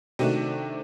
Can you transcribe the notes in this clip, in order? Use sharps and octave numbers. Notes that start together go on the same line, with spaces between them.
C3 D#3 A3 D4 F#4